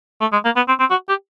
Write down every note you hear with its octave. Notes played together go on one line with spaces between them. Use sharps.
A3
G#3
A#3
B3
C4
C4
F#4
G4